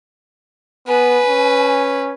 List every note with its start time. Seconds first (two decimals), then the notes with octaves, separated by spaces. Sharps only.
0.88 B3 B4 G#5
1.28 C#4